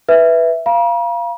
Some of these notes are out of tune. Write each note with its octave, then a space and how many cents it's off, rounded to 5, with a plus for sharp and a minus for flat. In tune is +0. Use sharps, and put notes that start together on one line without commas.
B4 +0 E5 +0
F5 -15 A#5 +45